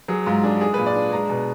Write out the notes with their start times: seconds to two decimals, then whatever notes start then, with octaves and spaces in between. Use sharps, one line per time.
0.08 F#3 G#4
0.26 G#2 F4
0.43 D4 G#4
0.61 G#3 G#4
0.74 A#2 B4
0.86 D5
0.95 D4
1.12 G#3 A#5
1.30 B2